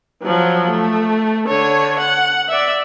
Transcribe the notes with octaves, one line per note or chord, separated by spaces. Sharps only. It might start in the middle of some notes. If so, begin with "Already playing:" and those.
F3 F#3
A3
D3 C#5
F#5
D5 E5